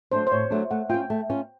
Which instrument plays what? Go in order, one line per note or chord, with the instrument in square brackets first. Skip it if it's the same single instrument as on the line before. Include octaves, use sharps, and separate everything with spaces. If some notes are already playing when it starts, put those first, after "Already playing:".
[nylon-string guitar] F#3 A3 D4 [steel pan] C5
[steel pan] C5
[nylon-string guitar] A2 [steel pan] C#5
[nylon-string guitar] F#3 A3 D4
[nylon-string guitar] A3 [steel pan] F#5
[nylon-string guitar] C#4 F4 [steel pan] G5
[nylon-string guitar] A3
C#4 F4